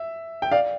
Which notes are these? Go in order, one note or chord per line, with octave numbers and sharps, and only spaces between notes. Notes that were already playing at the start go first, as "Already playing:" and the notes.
Already playing: E5
G5
D5 F5